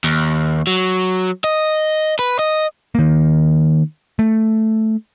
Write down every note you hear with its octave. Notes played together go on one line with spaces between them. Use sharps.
D#2
F#3
D#5
B4
D#5
D#3 A#3
A3